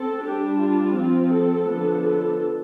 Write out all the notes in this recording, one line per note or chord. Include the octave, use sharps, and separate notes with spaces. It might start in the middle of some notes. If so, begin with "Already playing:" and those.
Already playing: C4 A4
G3 D4 G4
F4
F3 C4
A4
D3 F3 B3 D4
A4